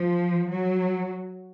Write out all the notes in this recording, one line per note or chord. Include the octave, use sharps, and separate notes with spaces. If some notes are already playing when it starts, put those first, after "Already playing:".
Already playing: F3
F#3